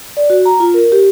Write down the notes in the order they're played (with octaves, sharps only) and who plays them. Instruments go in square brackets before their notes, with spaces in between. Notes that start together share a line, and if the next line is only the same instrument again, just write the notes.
[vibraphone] D5
F#4
A#5
F4
A#4
G4